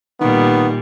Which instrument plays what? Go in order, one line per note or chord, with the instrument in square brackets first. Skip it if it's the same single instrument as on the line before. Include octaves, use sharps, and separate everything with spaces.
[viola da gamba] A#2 G3 [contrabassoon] D#3 [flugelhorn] B3